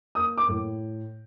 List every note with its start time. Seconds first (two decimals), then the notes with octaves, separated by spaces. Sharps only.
0.15 A#3 D#6
0.38 D6
0.49 A2